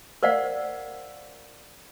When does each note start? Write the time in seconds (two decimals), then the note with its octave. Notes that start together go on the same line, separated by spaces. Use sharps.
0.23 A#4 C5 D5 F5 F#5